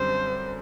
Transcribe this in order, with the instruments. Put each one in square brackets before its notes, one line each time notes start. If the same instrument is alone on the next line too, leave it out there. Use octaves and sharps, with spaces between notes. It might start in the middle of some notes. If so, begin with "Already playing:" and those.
Already playing: [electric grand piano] F#2 D3 G3 C4 [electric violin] C5